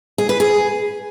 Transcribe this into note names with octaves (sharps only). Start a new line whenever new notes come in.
G#4
B4
G#4